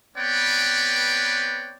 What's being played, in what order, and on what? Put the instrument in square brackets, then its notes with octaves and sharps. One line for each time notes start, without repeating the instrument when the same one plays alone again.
[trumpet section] B3 C4 B4 C#5 D5 G5